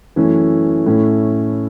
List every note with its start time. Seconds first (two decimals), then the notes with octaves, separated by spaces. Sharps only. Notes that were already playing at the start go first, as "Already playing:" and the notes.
0.16 F#2 E3 A3 C#4 E4
0.86 A2 A3 C#4 E4